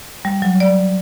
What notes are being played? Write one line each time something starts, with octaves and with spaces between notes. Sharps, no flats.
G3
F#3
D5